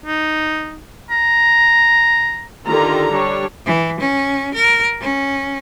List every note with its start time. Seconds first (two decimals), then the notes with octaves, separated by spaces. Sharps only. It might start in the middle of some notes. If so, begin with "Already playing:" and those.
0.06 D#4
1.11 A#5
2.67 D3 D#3 F4 G4 A#5
3.12 G3 D4 C#5
3.65 E3
4.00 C#4
4.54 A#4
5.01 C#4